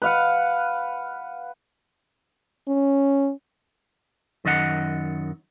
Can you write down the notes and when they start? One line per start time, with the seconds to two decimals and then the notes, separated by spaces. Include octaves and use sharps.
0.02 B4 F5 F#5
2.68 C#4
4.45 F#2 D#3 D#5 F#5